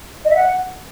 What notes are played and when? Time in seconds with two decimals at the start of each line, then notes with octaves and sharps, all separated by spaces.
0.24 D#5
0.30 E5
0.35 F#5